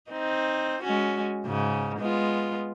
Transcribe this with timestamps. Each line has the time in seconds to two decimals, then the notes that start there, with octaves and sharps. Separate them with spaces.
0.11 C4 D#4
0.82 G#3 C#4 F#4
1.46 G#2 C#3
1.99 G#3 B3 F4